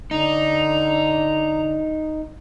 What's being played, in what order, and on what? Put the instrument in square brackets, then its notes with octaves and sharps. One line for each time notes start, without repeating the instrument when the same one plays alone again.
[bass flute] D3 [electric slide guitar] D#4 [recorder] A#5